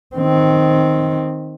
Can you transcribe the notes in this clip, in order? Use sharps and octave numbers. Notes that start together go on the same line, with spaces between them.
D#3 C4